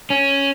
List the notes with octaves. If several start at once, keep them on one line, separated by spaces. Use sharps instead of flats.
C#4